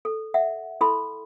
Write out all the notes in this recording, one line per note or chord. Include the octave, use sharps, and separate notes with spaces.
A4
E5 F#5
E4 A4 B5 C6